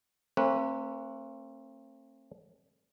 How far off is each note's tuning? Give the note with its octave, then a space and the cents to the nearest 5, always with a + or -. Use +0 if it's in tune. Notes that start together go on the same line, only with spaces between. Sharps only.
A3 +45 C4 +40 B4 -15